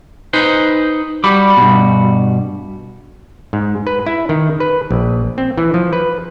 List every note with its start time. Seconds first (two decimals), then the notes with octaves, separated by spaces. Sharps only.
0.33 D#4 B4 C5
1.24 G3 F#4 B5 D6
1.57 G2 B2
3.53 G#2
3.87 B4
4.07 E4
4.29 D#3
4.60 B4
4.91 A#1
5.38 C4
5.58 E3
5.74 F3
5.93 B4